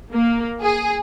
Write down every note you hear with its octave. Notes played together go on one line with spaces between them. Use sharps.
A#3
G#4